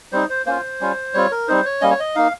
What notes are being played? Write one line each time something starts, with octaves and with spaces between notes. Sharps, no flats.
G3 C4 D#4 C5
C5
A#3 C#4 F4 C5
G3 C#4 F4
G3 C4 F4 C#5
A#4
G3 C4 D#4 C5
C#5
G3 A#3 C#4 D#5
C#5
D#5
A#3 D#4 F5